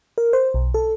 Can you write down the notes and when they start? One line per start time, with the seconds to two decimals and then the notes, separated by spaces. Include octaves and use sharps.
0.18 A#4
0.33 C5
0.54 B1
0.74 A4